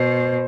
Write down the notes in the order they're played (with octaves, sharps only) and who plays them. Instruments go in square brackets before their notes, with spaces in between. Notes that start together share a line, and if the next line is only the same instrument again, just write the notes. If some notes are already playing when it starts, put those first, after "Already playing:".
Already playing: [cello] B2 [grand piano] C5